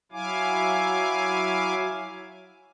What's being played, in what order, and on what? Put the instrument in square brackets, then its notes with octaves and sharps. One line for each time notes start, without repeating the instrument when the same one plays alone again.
[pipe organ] F#3 E4 F5 G#5 D6